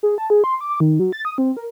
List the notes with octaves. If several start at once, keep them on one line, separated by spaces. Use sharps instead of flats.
G#4
A5
G#4
C6
D6
D#3
F#3
A6
D#6
C4
A#4